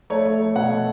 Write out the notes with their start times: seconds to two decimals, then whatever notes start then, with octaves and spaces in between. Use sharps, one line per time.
0.10 A3 C#5
0.26 A3
0.41 A3
0.55 B2 F#5
0.69 A3